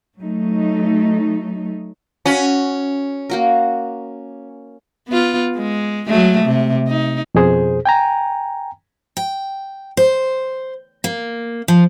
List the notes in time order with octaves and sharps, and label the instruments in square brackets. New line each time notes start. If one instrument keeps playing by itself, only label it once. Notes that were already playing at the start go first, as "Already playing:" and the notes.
[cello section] F#3 A3 D#4
[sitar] C#4 [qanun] F#4 G#5 B5
[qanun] A#3 F#4 A#4
[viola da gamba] B3 F4
G#3
F#3 G#3 A3
C3
D#4
[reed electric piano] F2 B2 G#4 C5
G5 G#5 A#5
[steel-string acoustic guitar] G5
C5
A#3
F3